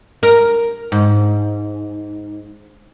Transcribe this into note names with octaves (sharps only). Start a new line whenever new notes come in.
A#4
G#2